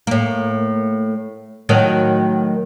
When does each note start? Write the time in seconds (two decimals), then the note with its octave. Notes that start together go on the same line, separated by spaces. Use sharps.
0.07 A2 A#3
1.69 A2 D#3 F#3